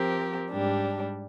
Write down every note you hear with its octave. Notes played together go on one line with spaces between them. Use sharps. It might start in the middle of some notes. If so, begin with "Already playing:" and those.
Already playing: F3 C4 G4 A#4
G#2 G3 D4 G4